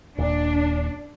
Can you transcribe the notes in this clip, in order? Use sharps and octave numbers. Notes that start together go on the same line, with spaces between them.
D#1 A#2 D4